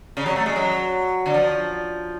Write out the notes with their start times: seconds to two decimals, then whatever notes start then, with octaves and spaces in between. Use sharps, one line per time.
0.17 C#3
0.26 F#3
0.36 A3
0.46 G#3
0.56 F#3
1.26 D3
1.34 F3